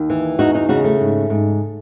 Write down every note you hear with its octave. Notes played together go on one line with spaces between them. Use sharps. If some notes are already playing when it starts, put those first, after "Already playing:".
Already playing: D#2
E3
E2 D#4 F#4
D#4 F#4
C#3 D#4 F#4
A3
G#2
G#2